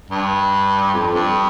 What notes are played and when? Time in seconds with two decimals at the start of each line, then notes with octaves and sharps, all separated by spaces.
0.10 G2
0.94 F2
1.15 G2